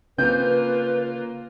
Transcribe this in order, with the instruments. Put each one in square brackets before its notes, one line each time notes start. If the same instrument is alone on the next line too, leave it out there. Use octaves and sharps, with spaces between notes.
[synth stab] B1 C4 G6 [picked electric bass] C#3 [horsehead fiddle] A#3 F4 [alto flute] B4